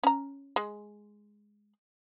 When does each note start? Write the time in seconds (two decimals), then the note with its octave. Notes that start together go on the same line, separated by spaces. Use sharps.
0.04 C#4 A#5
0.56 G#3